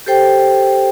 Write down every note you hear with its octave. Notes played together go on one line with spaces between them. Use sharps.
G4 A4 C5 G5